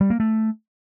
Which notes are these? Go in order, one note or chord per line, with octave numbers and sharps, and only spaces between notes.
G3
A#3
A3